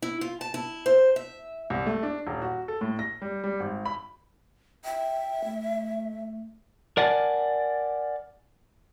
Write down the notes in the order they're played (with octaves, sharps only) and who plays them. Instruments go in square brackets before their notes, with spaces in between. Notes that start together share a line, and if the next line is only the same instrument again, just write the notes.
[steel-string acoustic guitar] E4
F4
A5
E4
C5
E5
[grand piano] C2
A3
D4
D#1
F#4
A4
A2
A#6
G3
G3
G#1
B5
[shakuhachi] E5 [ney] G5
[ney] A3
[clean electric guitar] A#4 D5 F#5 G#5 A5